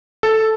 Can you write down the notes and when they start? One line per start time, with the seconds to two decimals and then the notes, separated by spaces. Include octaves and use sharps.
0.23 A4